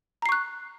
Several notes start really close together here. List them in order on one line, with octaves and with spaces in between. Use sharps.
A#5 C7 C#6 F#6